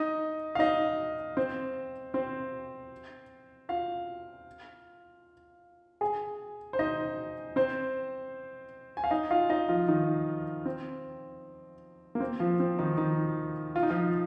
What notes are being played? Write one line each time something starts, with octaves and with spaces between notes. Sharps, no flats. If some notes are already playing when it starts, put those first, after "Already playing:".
Already playing: D#4 D#5
F5
D#4 D#5
C4 C5
C4 C5
F4 F5
G#4 G#5
C5
D#4 D#5
C4 C5
G#5
F5
D#4 D#5
F4 F5
D#4 D#5
F3 F4
D#3 D#4
C4
A#3
C4
F3 F4
C4
D#3 D#4
D#3 D#4
F4
D#4
F3 F4